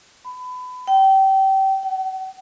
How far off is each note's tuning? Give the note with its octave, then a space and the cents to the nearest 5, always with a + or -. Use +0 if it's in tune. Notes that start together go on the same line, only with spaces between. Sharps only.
B5 +25
G5 -30
F#5 +40